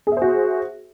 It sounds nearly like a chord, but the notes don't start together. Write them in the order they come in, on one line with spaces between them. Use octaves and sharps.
G#4 E5 C5 F#4